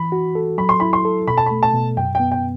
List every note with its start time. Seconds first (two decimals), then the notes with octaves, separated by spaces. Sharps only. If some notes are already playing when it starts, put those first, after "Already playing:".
Already playing: E3 B5
0.12 F#4
0.35 A4
0.58 F#3 B5
0.69 C6
0.80 E4 B5
0.93 C6
1.05 A4
1.27 B2 B5
1.38 A5
1.46 A3 B5
1.63 A5
1.74 B2
1.97 F#2 G5
2.15 B3 G5
2.32 G5